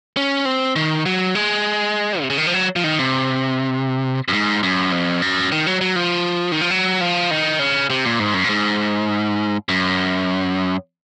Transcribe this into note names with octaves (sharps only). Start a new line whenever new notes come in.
C#4
C4
D#3
F#3
G#3
C3
C#3
D#3
F3
F#3
F3
D#3
C3
F#2
G#2
F#2
F2
F#2
D#3
F#3
F#3
F3
D#3
F3
F#3
F3
D#3
C#3
C3
A#2
G#2
F#2
A#2
G#2
F#2